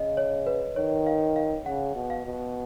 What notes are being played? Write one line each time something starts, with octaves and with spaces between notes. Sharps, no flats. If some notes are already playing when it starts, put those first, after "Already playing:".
Already playing: C#3 D#5
C#5
B4
D#3 C#5
F5
F5
C#3 F#5
B2
F5
B2